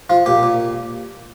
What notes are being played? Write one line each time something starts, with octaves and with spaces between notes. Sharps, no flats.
F3 F4
A#2 G4
A#2